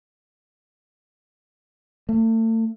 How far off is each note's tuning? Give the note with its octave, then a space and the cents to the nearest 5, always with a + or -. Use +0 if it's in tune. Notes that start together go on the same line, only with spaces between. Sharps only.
A3 +35